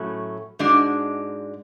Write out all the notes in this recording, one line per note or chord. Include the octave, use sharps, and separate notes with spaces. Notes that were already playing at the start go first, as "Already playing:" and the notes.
Already playing: A2 F#3 A3 C#4 F#4
G#2 G#3 D4 F#4